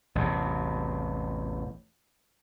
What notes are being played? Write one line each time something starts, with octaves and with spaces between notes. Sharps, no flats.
A1 E2 C3